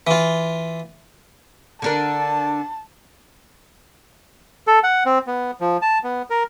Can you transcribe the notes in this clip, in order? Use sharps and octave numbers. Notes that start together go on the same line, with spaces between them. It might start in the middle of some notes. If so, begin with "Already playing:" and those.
E3 F4
D3 D4 A#4 A5
A4
F#5
C4
B3
F3
A5
B3
A#4